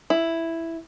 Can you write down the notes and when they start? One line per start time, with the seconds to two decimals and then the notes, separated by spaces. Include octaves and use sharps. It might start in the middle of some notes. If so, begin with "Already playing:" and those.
0.10 E4